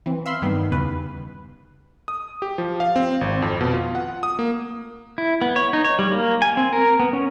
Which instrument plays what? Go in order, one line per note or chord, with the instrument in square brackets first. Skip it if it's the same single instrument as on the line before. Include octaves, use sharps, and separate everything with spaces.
[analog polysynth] E3 C4
E5 F5 B5 C6
G2 D#3 G3 B3
E2 C#3 B4
[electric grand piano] D#6
G4
F3
F5
C4
G#1
F2
B2
F4
F#5
D#6
A#3
[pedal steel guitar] E4
B3
C#5
D#4
C#5
G3
A#3
G#5
C4
A#4
B3
C#4